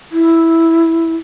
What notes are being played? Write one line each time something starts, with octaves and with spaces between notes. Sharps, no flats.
E4